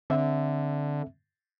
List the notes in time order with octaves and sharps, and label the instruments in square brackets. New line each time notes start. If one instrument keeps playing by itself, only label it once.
[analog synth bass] D3 [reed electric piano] C4 E5